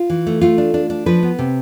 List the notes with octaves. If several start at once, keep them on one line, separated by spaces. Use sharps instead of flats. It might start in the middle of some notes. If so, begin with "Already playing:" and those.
Already playing: F4
E3
A3
A3 F4
D4
D4
D4
F3 B4
B3
C3